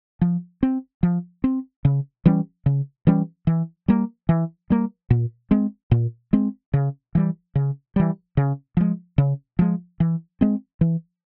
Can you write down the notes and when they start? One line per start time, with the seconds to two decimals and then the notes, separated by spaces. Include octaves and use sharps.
0.21 F3
0.63 C4
1.03 F3
1.44 C4
1.85 C#3
2.25 E3 G3 C#4
2.66 C#3
3.07 E3 G3 C#4
3.47 E3
3.88 G3 A#3
4.29 E3
4.70 G3 A#3
5.10 A#2
5.51 G#3 C4
5.91 A#2
6.33 G#3 C4
6.74 C#3
7.15 E3 G3
7.55 C#3
7.96 E3 G3
8.37 C#3
8.77 F3 G#3
9.18 C#3
9.59 F3 G#3
10.00 E3
10.41 G#3 C4
10.81 E3